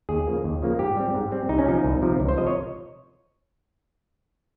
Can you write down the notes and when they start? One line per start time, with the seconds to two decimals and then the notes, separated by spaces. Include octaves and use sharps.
0.09 D#2 G#4
0.27 C#3 F3 A#3
0.44 D#2
0.62 C#3 F3 A#3
0.79 G#2 G4
0.97 G3 C4
1.14 G#2
1.32 G3 C4
1.49 C2 D#4
1.58 C#4
1.67 C3 F3 D#4
1.84 C2
2.02 C3 F3
2.20 C#2
2.29 C5
2.37 C3 F3 D#5
2.47 C#5